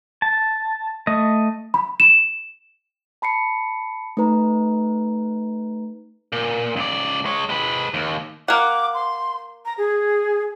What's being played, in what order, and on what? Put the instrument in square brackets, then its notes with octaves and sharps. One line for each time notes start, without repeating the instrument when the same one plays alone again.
[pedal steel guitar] A5
A3 D#5
[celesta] B5
E7
[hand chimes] A5 B5 C7 C#7
A3 D#4 B4 A#5
[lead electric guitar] A#2
C#2 D5
G#3 C#5
G#3 B4
D#2
[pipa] A#3 F#5 [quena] D6
[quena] C6
A#5
G#4